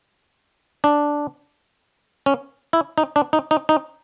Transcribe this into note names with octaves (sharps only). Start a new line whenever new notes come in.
D4
C#4
E4
D#4
D4
D#4
D#4
D#4